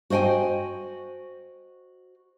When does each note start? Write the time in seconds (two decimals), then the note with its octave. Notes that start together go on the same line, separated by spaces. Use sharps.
0.10 F#4 C5 D#5 G5 G#5